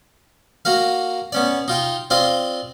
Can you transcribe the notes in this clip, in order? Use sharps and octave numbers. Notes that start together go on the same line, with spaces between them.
A#3 F#4 A#4 F5
B3 C#4 D5
D#4 F4 G5
C4 F4 D5 D#5 F5